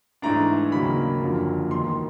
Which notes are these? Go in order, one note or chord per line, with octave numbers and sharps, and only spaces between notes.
G#2 E3 A3 D4 A#5
D#2 C#3 F#3 A#3 B5
F#1 F2 D3 F#3 A#3
E1 D#2 D#3 C6